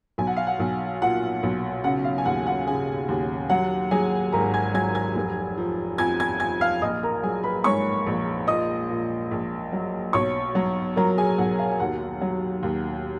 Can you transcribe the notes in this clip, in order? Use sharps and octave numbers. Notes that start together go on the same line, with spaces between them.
B1 G#5
F#5
F5
F#5
B1
A#2 F#5
B1
C#3 F#5
F5
G#5
D#2 F#5
F#5
C#3 G#4 G#5
D#2
F#3 F#5
F#3 G#4 G#5
G#1 A#4 A#5
G#5 G#6
F#3 G#5 G#6
G#5 G#6
F1
F3
F2 G#5 G#6
G#5 G#6
F3 G#5 G#6
F5 F6
A#1 D#5 D#6
A#4 A#5
F#3 G#4 G#5
B4 B5
G#2 C#5 C#6
A#1
A#2 D#5 D#6
A#2
A#1
F#3
B1 C#5 C#6
F#3
F#3 A#4 A#5
G#4 G#5
B1 F#5
F5
G#5
D#2 F#5
F#3
D#2